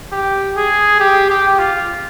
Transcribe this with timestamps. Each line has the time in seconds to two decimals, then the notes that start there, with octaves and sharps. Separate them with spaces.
0.12 G4
0.56 G#4
1.00 G4
1.30 G4
1.58 F4